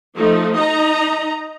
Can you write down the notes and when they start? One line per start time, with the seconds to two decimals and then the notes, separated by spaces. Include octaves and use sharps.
0.16 F3 A3 D#4
0.55 D#4 D#5 A#5